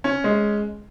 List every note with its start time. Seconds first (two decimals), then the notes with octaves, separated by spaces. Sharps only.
0.04 C#4
0.24 G#3